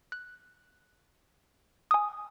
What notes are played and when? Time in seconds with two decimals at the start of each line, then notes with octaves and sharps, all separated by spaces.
0.12 F#6
1.91 G#5 D#6